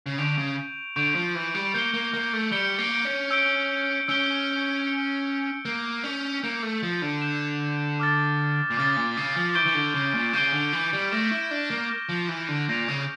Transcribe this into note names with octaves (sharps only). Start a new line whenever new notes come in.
C#3
D3 C#6 G6 D7 F7
C#3
D3 C#6 G6 D7 F7
F3
E3
G3
A#3 G6 C#7 G7
A#3
A#3
A3
G3 G6 C#7 G7
A#3
C#4
E6 G6 D7 G7
C#4 E6 G6 D7 G7
G6 C#7 G7
A#3 G6 C#7 G7
C#4
A#3 G6 C#7 E7
A3
F3
D3
G6 C#7 E7
D6 F6 A6
A#2
C#3 D6 F6 A6
A#2
C#3
F3
E3 C#6 G6 D7 G7
E3
D3
C#3
A#2
C#3 C#6 G6 D7 G7
D3
E3
G3
A3 F6 A#6 E7
E4
D4
A#3
F6 A#6 E7
F3
E3
D3
A#2 G6 A#6 D7 F7
C#3